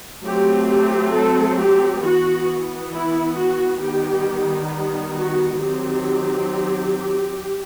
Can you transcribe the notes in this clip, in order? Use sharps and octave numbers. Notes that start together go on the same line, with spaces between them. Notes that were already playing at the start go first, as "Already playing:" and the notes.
F#3 A3 C4 G4
G4
A4
G4
E3 B3 F#4
E4
F#4
D#3 G3 B3 G4
F#4
D#3 F#3 C4 G4